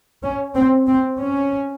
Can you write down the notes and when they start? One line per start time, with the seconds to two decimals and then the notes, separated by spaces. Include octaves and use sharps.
0.23 C#4
0.55 C4
0.87 C4
1.19 C#4